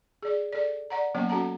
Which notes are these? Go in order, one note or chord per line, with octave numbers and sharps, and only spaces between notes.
G#4 D5
A4 D5
D5 F#5 A#5
F#3 A#3 B3 C#4 C#5 F#5
C#4 F#4 A4 F#5 A5 A#5